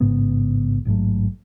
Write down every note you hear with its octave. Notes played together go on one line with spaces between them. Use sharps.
A1 G#2 C#3 B3
A1 G#2 F#3 A3